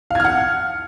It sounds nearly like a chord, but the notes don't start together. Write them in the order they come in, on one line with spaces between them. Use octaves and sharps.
F5 G#6 F6 F#5